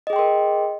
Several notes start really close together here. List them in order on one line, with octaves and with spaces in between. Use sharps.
D#5 G#4 G5 C6 A#4